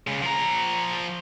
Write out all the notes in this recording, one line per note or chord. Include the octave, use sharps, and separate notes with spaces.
C#3 G#3
F3 A#5